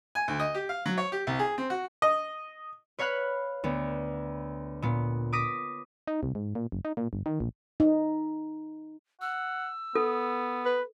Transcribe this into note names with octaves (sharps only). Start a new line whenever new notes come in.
G#5
D2
D#5
G4
F5
F#3
C#5
G4
C2
G#4
C4
F#4
D#5
B4 C#5 F5 B5 F#6
D2 B3
A#2 B3
D6 D#6 A#6 B6 D7 D#7
D#4
C2
G#2
A#2
F#1
D#4
A#2
G1
D#3
A#1
D#4
F#5 E6
B3 A4
B4